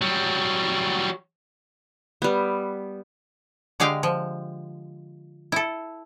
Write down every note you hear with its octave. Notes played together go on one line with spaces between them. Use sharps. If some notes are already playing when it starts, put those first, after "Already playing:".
F#3 G3
G3 B3
D3 G#3 G4 F5 G5
F3
E4 A4